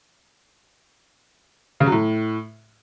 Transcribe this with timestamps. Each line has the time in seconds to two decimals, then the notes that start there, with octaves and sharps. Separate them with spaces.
1.80 C#3
1.86 F#3
1.92 A2